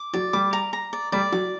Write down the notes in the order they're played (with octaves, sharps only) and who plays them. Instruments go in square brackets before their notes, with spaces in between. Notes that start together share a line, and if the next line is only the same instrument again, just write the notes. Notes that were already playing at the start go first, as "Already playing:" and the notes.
Already playing: [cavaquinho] D6
[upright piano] F#3 [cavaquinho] D5
[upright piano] G3 [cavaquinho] D6
[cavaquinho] A#5
A#5
D5
[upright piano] G3 [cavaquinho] D5
[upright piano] F#3 [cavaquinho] D6